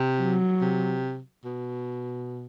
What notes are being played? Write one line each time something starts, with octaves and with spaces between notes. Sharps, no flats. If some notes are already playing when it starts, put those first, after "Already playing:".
Already playing: C3
F#3
C3
B2